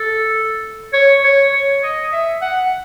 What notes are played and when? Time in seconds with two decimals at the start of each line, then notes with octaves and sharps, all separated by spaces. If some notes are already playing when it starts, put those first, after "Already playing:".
Already playing: A4
0.93 C#5
1.24 C#5
1.53 C#5
1.83 D#5
2.13 E5
2.42 F#5